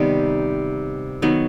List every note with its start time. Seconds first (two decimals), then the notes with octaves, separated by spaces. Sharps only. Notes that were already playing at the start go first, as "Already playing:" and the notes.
Already playing: C3 D#3 G3 B3
1.22 D#3 F#3 B3